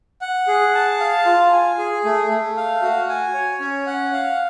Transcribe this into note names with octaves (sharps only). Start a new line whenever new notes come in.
F#5
G#4
A5
F5
F4
G#5
G#4
A3
A3
F5
F#4
G#5
C#5
C#4
F#5
F5